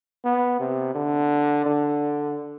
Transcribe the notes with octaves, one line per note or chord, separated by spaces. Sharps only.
B3
C3
D3
D3